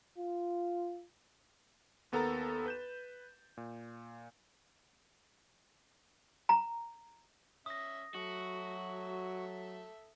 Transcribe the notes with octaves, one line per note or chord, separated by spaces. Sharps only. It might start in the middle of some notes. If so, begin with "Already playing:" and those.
F4
D#2 B3 A4 A#4 A#5 A6
B4 G6 E7
A#2
A#5
C#4 E5 D#6 A#6
F#3 F#4 A4 E5